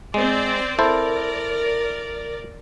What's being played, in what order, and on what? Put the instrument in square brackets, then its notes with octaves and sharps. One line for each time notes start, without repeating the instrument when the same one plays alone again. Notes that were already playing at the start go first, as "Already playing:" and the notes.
[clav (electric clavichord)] G#3 [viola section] C4 C5 D5
[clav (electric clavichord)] E4 A4 C5 [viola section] A#4 D5